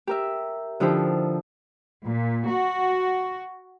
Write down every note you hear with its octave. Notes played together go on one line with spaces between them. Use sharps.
G4 A#4 E5
D3 F3 D#4 E4 G4 C5
A#2
F#4